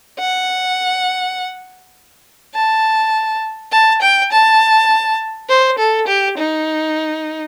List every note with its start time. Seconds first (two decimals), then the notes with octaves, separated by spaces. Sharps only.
0.19 F#5
2.55 A5
3.72 A5
4.02 G5
4.32 A5
5.49 C5
5.78 A4
6.07 G4
6.37 D#4